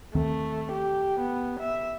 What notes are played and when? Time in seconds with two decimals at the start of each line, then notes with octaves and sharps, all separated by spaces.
0.15 D#2 D#3 A3 C4
0.72 G4
1.20 B3
1.60 E5